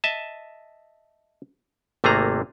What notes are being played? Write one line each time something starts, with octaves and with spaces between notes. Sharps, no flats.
D#5 E5 A5
G#1 C3 A3 A#3 G#4 A#5